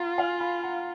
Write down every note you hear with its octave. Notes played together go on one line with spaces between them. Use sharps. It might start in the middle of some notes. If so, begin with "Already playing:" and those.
Already playing: F4 F#5 A#5
F5 G#5
G#5 B5
F#5 A#5